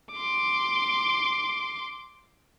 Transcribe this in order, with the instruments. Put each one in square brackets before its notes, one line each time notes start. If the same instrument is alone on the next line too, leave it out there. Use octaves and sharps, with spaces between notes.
[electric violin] C6 D6